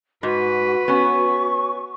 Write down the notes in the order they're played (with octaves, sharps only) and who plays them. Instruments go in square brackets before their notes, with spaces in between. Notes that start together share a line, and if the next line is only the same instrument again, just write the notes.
[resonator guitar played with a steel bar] G#2 [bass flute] F#4 [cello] B4
[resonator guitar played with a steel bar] B3 C#4 [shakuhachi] C#6